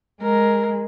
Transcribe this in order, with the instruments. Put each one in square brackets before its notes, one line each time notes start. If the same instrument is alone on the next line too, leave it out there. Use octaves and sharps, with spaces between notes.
[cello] G#3 [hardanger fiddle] A#4